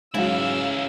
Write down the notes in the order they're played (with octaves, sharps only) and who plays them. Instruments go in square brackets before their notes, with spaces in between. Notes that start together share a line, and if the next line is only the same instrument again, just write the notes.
[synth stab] G#2 F#3 [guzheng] C#3 [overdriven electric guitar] C#4 E4 [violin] F5 E6